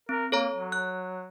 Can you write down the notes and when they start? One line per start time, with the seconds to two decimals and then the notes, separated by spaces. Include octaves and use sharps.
0.09 C4 A#4
0.32 A#3 A4 C#5 A#5
0.53 F#3
0.72 F#6